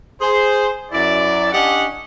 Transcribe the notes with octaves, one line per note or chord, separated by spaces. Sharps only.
G#4 C5
F#2 E4 D5
C#4 D4 G4 D#5 F#5